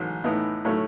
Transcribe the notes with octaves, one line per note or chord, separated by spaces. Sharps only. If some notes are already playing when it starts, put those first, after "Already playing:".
Already playing: A1 G#2 F#3
A2 E3 B3 D#4
A2 F#3 A3 C#4